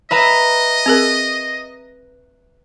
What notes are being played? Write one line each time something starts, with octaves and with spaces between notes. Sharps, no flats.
B4 D#5 E5 A#5
C4 G#4 A#4